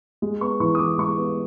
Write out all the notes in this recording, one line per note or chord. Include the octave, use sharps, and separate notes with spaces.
G#3
B3 C#6
E3 C#6
D#6
E3 D6
G#3 C#6
B3